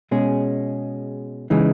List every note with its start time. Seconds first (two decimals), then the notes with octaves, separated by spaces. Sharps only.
0.11 B2 G#3 C#4 G#4
1.50 C#3 E3 G#3 D#4